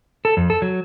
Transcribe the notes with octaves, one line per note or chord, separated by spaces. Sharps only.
A4
F2
A4
F#3